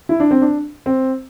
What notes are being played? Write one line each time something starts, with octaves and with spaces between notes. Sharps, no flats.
E4
D4
C4
D4
C4